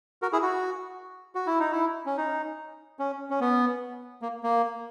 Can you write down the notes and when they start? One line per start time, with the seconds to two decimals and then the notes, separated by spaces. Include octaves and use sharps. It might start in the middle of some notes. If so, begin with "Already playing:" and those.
0.22 F#4 A#4
0.33 E4 G#4
0.42 F#4
1.35 F#4
1.47 E4
1.60 D#4
1.72 E4
2.06 C#4
2.17 D#4
2.99 C#4
3.30 C#4
3.41 B3
4.22 A#3
4.43 A#3